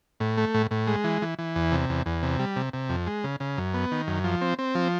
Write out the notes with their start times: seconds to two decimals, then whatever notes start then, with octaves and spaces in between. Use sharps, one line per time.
0.20 A2
0.37 A3
0.54 A2
0.71 A2
0.87 G#3
1.04 E3
1.22 E3
1.39 E3
1.55 E2
1.72 C3
1.89 E2
2.06 E2
2.23 C3
2.39 G3
2.56 C3
2.73 C3
2.89 F2
3.07 G#3
3.24 C#3
3.40 C#3
3.57 F#2
3.74 B3
3.92 D#3
4.07 F#2
4.24 F3
4.41 C4
4.59 C4
4.75 F3